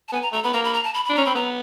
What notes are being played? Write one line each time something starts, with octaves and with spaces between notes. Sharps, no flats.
A5
B3 G#5
A#5
A3 A#5
B3 B5
A#3 A#5
B5
A#5
A5
B5
B5
D4
A#5
C#4
C4 B5
B3 A#5